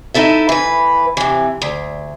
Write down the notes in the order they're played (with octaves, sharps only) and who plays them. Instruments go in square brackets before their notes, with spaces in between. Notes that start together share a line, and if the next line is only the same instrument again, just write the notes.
[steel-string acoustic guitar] D#4 E4 A4 E5
E3 B4
C3 E3
D2